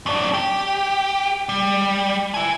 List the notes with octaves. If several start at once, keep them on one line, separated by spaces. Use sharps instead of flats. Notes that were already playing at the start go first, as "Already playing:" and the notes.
F#2 D4
G4
G3
E5 G#5